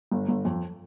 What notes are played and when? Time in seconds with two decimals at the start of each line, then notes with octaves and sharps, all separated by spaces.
0.11 G1
0.28 G1
0.45 F2